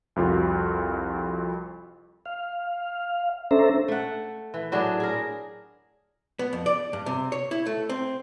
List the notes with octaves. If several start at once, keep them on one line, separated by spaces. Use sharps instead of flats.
C2 F2 F4 F#4
F5
C#4 D4 A4 C5 E5 A#5
A3 F#5
E3
A2 F#3 D4 G#4
G#4 A#4
B3
F2
D5
G2
C3
C#5
E4
A3
C4